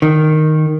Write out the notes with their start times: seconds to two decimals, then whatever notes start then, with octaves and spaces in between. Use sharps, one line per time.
0.02 D#3